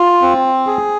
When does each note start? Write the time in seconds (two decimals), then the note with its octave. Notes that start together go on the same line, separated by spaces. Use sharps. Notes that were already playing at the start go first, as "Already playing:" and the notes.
Already playing: F4
0.22 C4
0.67 G#4